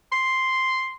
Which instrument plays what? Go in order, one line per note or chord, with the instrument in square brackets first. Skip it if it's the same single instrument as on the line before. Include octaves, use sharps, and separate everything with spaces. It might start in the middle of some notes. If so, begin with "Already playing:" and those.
[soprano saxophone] C6